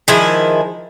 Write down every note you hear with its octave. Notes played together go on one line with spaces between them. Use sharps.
D#3 F3 G#3 E4